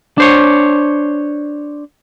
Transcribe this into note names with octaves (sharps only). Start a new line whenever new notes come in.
D4 C5 C#5